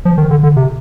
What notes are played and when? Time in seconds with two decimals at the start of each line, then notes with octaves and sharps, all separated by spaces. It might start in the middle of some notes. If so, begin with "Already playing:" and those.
0.05 F3
0.18 D#3
0.31 D3
0.43 D3
0.56 C3